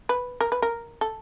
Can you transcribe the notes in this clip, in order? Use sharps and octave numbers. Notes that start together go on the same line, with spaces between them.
B4
A#4
B4
A#4
A4